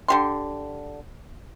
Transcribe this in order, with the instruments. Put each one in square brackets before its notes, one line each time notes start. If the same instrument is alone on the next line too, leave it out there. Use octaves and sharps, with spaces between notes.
[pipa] D3 G4 C6